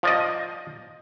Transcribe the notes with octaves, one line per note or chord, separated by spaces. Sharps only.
F3 D5 D#5